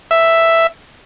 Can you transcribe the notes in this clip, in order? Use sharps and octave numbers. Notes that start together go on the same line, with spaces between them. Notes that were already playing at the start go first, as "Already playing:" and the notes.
E5